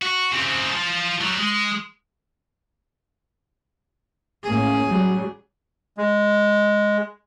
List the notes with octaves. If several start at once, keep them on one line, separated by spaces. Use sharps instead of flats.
F#4
C#3 C4
F4 A5
F#3 G3
G#3
A2 A#3 C#4 G#4
F#3 G3
G#3